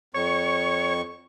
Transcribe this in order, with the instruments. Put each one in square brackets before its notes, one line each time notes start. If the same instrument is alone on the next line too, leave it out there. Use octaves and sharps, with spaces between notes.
[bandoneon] F2 C#6 [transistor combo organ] C#5